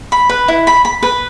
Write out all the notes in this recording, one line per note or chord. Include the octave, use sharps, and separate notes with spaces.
B5
B4
E4
B5
B5
B4